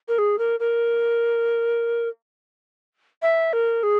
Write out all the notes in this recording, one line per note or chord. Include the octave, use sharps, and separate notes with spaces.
A#4
G#4
A#4
A#4
E5
A#4
G#4